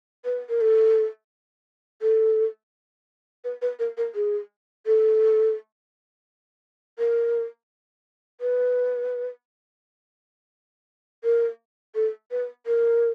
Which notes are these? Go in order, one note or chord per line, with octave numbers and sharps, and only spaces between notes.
B4
A#4
A4
A4
B4
B4
A#4
A#4
G#4
A4
A#4
B4
A#4
A4
B4
A#4